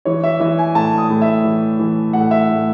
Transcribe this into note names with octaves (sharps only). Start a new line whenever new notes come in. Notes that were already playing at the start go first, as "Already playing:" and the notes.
E3 C#5
E5
E3 E5
G#5
A2 A5
D#6
A2
E5
E3
E3
A2 F#5
E5
A2